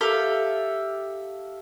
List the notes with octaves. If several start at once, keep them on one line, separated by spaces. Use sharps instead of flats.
G4 A4 E5 F5